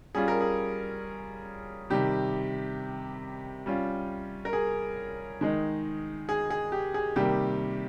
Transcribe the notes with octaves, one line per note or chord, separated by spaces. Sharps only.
G3 C#4 F4 G#4
A#4
G#4
C3 D#3 G3 G4
G3 C#4 F4
A#4
G#4
D#3 G#3 D#4
G#4
G#4
G4
G#4
C3 D#3 G3 A#3 G4